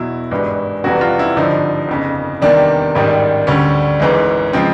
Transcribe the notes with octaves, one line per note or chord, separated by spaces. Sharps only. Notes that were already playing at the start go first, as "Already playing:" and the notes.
Already playing: E2 B2 F#3 E4
G#1 G2 E3 G#3
F1 F2 C3 E3 G3 F#4
F4
E4
G#1 G2 D3 F3 D#4
G1 F2 C#3
E2 C3 D#3 G3 D4
A1 G#2 D#3 G3
D2 D3 G3 C#4
G#1 G#2 E3 G#3
C#3 F3 G#3 C4